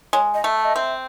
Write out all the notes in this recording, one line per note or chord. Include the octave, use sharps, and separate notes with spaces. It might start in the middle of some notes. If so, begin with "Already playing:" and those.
G#3 C#5
D#5
A3
E5
D#5
C4 E5